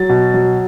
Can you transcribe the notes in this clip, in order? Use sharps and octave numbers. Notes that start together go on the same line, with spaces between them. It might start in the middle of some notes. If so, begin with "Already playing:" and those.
Already playing: F#3 A6
B2
F#3